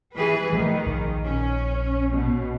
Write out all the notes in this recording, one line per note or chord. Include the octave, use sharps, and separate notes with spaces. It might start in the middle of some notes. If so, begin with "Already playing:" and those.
E3 G#4 B4
D#3 F3 G#3 A3
A#1
C#4
B2